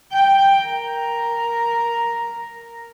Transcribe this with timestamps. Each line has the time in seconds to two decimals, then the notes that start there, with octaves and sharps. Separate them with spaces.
0.13 G5
0.64 A#4